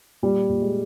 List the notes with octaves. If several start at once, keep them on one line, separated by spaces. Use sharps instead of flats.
A#2 G3
A#2
G#3